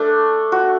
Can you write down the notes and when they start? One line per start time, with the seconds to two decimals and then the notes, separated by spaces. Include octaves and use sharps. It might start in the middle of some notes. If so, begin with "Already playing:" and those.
Already playing: A3 D4
0.52 F#4